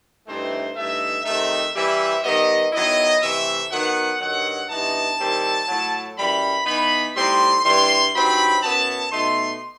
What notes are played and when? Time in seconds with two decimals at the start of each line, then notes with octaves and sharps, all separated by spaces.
0.27 G2 E3 A3 C4 D#4 C5
0.76 G2 E3 A3 D#4 E5
1.25 C3 D#3 A3 C4 D#4 E5
1.74 E3 G3 C4 E4 E5
2.23 D#3 G3 B3 D#5
2.73 D#3 F#3 B3 E4 D#5
3.22 C3 E3 A3 E5
3.71 D#3 F#3 B3 F#5
4.20 G2 D#3 F#3 F#5
4.69 G2 E3 B3 D#4 A5
5.18 D#3 G3 C4 E4
5.68 A2 F#3 A3
6.17 F#2 E3 G3 B5
6.66 E3 B3 D#4 B5
7.15 A2 G3 C4 D#4 C6
7.65 G2 E3 G3 C6
8.13 G2 F#3 C4 D#4 B5
8.63 F#2 F#3 B3 E4 A5
9.12 B2 A3 D#4 C6